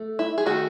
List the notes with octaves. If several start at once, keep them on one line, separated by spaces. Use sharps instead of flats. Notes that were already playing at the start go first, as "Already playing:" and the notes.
Already playing: A3
E4
G#4
D#3 A3 D#4 F#4